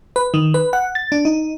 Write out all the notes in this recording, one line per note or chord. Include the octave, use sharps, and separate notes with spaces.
B4
D#3
B4
F#5
A6
D4
D#4